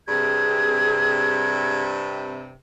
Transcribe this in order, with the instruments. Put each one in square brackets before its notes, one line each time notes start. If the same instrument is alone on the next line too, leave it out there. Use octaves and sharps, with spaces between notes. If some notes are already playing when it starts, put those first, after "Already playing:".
[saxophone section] G2 C3 [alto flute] G#4 [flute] G#6